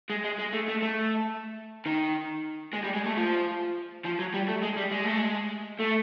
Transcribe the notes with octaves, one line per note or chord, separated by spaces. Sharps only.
G#3
G#3
G#3
A3
A3
A3
D#3
G#3
G3
G#3
A3
F3
F3
F#3
G3
A3
G#3
G3
G#3
A3
G#3
A3